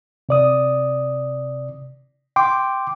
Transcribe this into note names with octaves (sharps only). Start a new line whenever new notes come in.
C3 D5 D#6
G5 C6 D6